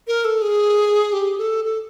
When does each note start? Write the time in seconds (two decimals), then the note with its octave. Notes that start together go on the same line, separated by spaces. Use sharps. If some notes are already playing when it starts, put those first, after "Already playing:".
0.07 A#4
0.25 A4
0.42 G#4
1.13 G4
1.38 A4
1.64 A4